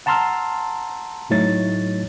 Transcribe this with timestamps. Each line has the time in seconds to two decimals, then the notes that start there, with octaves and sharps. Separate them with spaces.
0.06 F#5 A5 A#5 C6 E6 F6
1.30 A2 F#3 A3 D#4 C#5 A6